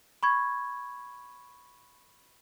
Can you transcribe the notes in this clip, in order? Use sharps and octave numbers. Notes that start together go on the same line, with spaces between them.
B5 C#6 G#6